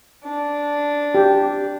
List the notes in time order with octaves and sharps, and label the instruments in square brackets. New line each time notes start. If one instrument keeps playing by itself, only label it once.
[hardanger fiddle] D4
[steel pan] G4